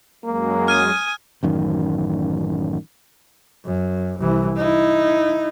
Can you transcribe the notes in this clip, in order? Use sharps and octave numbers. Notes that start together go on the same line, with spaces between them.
F#2 F#3 G#3 A#3
G#5 D#6 F6 D#7
A1 F#2 D#3
F#2
C2 E3
D#4 E4